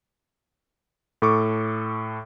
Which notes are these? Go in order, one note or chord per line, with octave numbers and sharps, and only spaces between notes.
A2 A4 C#6 D6